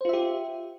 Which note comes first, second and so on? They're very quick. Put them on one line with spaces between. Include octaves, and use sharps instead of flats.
C5 F4 E5 G4